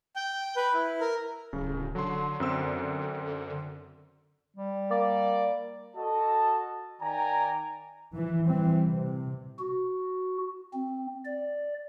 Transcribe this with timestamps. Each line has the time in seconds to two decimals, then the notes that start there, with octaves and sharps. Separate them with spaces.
0.16 G5
0.56 B4
0.74 E4
1.01 A#4
1.53 D1 C#3
1.95 D3 F#3 C6
2.40 F#2 C4 E6
4.57 G3
4.91 A#3 D5
5.97 F#4 A4 D#5 A5
7.02 D#3 D5 G5 G#5 A#5
8.15 E3
8.46 E3 G3 C4
8.87 C3
9.59 F#4
10.73 C4
11.25 D5